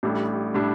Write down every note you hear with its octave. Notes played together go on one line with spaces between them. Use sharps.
A1 A2 G3 D4 A4
A2 G3 D4 A4